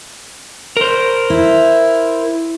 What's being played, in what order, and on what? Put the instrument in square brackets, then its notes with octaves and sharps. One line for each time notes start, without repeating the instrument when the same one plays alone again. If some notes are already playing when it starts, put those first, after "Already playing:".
[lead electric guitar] A#4 C5
[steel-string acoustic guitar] E4